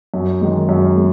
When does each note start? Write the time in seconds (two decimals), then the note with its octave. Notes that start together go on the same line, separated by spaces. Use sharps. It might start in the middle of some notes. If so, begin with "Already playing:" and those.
0.14 F#2
0.41 D#3 G#3
0.69 F#2
0.97 G#3